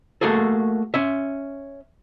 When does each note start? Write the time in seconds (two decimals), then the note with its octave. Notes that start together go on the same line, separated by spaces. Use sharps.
0.21 A3 A#3 F#4 G#4 A4
0.94 C#4 E5